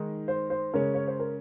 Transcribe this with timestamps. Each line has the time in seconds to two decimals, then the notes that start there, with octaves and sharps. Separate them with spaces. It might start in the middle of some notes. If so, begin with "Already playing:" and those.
Already playing: D#3 G#3 D#4
0.28 C5
0.50 C5
0.73 C#3 G#3 C#4 A#4 C#5
0.94 C#5
1.07 C5
1.20 A#4